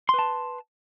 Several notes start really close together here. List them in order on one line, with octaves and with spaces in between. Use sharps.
C6 B4 A5